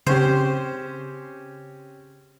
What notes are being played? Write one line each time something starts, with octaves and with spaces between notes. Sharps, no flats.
C#3 C4 C#4 G4 C5